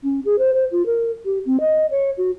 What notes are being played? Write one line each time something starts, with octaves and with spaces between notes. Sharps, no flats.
C#4
G#4
C5
C5
F4
A#4
G4
C4
D#5
C#5
F#4